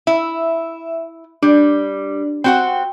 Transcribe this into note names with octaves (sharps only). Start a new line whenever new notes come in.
E4 E5
G3 D4
C4 F#4 F#5 G5